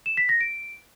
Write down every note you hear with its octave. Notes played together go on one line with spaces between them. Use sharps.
E7
B6
A#6
D7